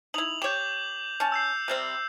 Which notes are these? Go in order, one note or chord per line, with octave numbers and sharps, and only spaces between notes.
D#4 E4 F7 F#7
G4 C#5 D6 G6
C#4 A5
E6 G6 C7
C3 G3 C4